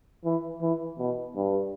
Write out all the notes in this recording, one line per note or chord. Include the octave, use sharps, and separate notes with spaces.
E3
E3
B2
G2